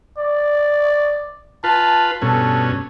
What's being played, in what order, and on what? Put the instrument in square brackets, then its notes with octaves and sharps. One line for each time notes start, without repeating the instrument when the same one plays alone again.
[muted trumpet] D5
[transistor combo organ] F4 B4 [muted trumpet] A5
[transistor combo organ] G2 B2 C#4 [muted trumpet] A4